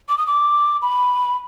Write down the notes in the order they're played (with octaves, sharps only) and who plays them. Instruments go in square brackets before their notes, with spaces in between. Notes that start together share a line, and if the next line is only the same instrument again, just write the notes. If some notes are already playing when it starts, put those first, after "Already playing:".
[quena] D6
D#6
D6
B5